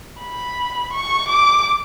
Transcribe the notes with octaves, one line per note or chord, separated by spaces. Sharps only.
B5
C#6
D6